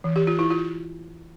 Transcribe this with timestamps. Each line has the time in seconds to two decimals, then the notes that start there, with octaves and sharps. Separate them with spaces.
0.04 E3
0.16 G4
0.27 F4
0.39 E4
0.50 F4